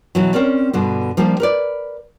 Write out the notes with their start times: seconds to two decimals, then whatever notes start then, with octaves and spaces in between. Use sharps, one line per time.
0.15 B2 E3 F#3
0.34 C4 C#4 A#4 D5
0.73 G2 B2 D3
1.17 F3 G3 A#3 D4 G4
1.40 A#4 B4 D5